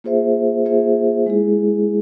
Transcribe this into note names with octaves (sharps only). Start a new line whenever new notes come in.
A#3 F4 G#4 C5 E5
A#3 F4 G#4 C5 E5
G#3 E4 G#4